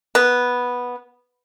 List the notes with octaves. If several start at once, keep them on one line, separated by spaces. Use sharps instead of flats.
B3